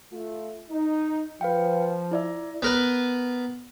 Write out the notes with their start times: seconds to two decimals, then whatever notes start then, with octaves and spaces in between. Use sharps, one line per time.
0.12 A3 F4
0.70 D#4
1.41 F3 B4 F5 G5
2.11 E4 D5 E5
2.62 B3 A#4 B4